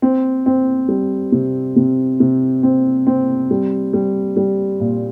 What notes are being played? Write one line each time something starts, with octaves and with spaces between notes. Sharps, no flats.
C4
C4
G3
C3
C3
C3
C4
C4
G3
G3
G3
A#2